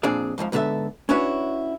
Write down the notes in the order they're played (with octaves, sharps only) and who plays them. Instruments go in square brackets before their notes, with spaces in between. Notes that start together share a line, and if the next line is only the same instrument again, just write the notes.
[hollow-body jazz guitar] F2 A#2 C4 D4 G#4 D5
F2 G#2 D#3 F3
G#2 D3 B3 C#4 A4 E5
C#4 D4 E4 F#4 B4 C#5